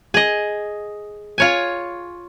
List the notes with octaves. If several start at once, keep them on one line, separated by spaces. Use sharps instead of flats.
G#4 D#5
F4 C#5 G#5